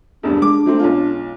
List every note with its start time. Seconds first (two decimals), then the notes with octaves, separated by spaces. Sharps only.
0.23 E1 E2 G2 D4
0.42 G#3 D6
0.66 F#3 A3 C4
0.79 B1 C#4 F4